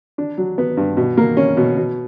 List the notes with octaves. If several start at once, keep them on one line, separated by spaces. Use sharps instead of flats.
D4
F#3
B3
G2
B2
A#3
C#4
B2
B2